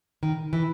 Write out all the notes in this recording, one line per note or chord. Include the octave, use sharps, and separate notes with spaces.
D#3
E3